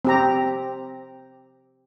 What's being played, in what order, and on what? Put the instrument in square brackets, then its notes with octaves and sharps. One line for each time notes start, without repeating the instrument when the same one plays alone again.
[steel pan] C4 G4 A#5